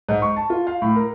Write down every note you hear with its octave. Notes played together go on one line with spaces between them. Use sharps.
G#2
C#6
A5
F4
F5
A2
A#4